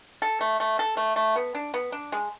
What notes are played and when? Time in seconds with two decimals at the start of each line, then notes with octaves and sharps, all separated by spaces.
0.22 A4
0.41 A3
0.60 A3
0.79 A4
0.97 A3
1.16 A3
1.36 B3
1.55 D4
1.74 B3
1.92 D4
2.12 G#3